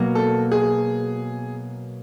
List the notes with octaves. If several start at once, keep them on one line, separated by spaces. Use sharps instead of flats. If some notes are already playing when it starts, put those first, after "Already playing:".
Already playing: B2 F#3 A#3
A4
G#4